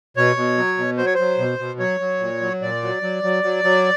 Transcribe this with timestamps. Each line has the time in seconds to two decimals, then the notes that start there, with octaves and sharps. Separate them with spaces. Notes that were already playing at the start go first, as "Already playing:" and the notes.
0.17 B2 C#5
0.36 B2
0.58 F#3
0.78 B2
0.98 F#3 C5
1.06 C#5
1.14 F#3 C5
1.38 B2
1.59 B2
1.79 F#3 C#5
2.00 F#3
2.20 A#2
2.41 F#3
2.62 A#2 D5
2.83 F#3
3.03 F#3
3.23 F#3
3.44 F#3
3.64 F#3